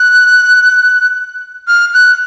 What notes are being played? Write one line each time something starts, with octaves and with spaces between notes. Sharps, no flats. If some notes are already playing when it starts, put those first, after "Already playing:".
Already playing: F#6
F6
F#6